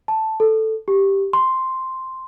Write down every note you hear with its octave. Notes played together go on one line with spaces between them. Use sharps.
A5
A4
G4
C6